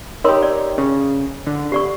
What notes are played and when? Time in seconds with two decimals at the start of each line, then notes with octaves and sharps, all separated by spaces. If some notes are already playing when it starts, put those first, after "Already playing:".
0.24 D#4 G4 A#4 C#5 C6
0.42 D5
0.78 C#3
1.47 D3
1.72 G4 D5 C#6